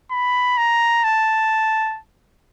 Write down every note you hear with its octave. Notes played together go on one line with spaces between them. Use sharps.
B5
A#5
A5